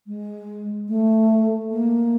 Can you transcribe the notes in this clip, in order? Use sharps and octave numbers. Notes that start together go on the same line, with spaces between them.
G#3
A3
A#3